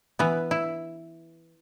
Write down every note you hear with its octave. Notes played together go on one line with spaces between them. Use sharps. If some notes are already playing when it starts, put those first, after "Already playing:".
E3 B3 B4
E4